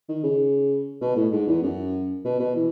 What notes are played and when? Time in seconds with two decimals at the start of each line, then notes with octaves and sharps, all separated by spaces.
0.09 D#3
0.23 C#3
1.01 B2
1.16 A2
1.32 G#2
1.47 E2
1.62 F#2
2.25 B2
2.40 B2
2.55 E3